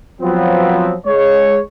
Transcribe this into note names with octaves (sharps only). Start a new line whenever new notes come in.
F3 F#3 B3 C4
G#3 C#5